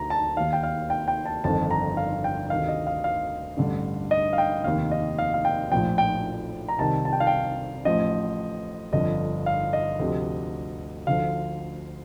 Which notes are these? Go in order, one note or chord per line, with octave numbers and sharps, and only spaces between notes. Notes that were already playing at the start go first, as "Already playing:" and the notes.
Already playing: D2 A#5
A5
D#2 D#3 F5
G5
F5
G5
G5
A5
G1 F2 D#3 A5
A#5
F5
G5
D2 C3 D#3 F5
D#5
F5
F5
A1 G2 D3
D#5
F5
G5
F1 D#2 D#3 F5
D#5
F5
F5
G5
A#1 A2 F3 G5
G5
A#5
C2 C3 D#3 A5
A5
G5
F5
G5
A1 A2 F3 D#5
G1 F2 D3 F3 D#5
F5
D#5
D2 C3 F3
D2 D3 F3 F5